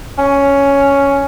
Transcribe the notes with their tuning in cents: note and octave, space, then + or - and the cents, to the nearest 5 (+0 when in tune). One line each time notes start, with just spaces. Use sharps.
C#4 +5